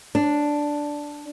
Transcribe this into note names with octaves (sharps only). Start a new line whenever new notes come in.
D4